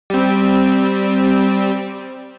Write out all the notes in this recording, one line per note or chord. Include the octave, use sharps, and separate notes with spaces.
G3 C4